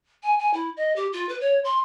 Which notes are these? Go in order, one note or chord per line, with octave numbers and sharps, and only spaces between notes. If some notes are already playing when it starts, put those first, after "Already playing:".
G#5
G#5
E4
D#5
G4
F4
B4
C#5
C6